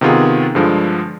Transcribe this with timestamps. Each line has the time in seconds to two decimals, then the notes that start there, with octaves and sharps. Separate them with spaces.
0.01 C3 D#3 B3 F4 G#4
0.55 G2 D3 F3 G#3